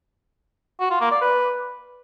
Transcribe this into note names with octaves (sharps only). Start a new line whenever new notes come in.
F#4
F4
A#3
D5
B4